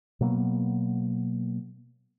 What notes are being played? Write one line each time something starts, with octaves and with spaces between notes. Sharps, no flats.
B2 F#3 A#3 B3